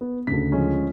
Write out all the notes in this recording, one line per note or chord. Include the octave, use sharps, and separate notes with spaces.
B3
D2 C#3 B6
F3 G#3 C#4